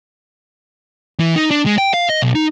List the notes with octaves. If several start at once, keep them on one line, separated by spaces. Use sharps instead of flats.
E3
D#4
D4
G#3
G5
F5
D#5
B1
D#4